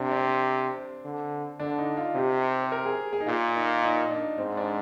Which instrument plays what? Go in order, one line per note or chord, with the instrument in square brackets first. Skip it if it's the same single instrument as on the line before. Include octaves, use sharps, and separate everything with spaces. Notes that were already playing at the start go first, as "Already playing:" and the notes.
Already playing: [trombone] C3 [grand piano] D4
[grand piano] D4
C4
[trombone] D3
[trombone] D3 [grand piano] D4
[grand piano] D#4
F4
[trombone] C3 [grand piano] G4
[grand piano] C5
A#4
G#4
G#4
D#4
[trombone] A#2 [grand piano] F4
[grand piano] D#4
D#4
D4
[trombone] G#2 [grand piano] C4
[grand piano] D4